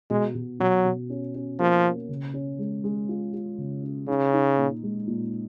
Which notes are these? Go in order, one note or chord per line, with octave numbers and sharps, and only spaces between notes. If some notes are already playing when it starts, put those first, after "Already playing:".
B2 G#3
B2
B2 F#3
B2
C#4
C#4
F3 A#3
C#4
C#3
C#4
G#3
G#3
F4
F4
C#3
C#4
C#3 D#4
D#4
A#2
G#3
A#2